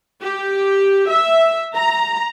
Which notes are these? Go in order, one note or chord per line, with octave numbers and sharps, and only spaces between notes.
G4
E5
A#5